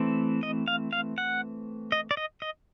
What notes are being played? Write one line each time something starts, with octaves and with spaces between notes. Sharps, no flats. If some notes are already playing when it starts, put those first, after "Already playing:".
Already playing: E3 A3 C4
D#5
F5
F5
F#5
D#5
D5
D#5
D#5